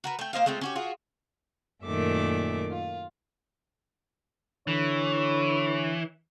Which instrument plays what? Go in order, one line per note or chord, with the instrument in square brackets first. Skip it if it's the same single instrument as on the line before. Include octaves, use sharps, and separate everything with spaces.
[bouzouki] F#4 A#4 B4
A3 G5
A#3 C5 D#5 F5
G#3 A3 C4 F4
C#4 F#4 G4
F4 F#4 G#4
[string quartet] F#2 A#2 D#3 A3 E5 D6
F4
[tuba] D3 [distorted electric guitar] E3 [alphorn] C#5